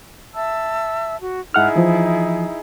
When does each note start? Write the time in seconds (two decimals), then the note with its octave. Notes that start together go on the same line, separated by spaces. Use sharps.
0.35 E5 A5 E6
1.20 F#4
1.54 G#2 D#4 E4 G#4 F#5 F6
1.76 E3 F3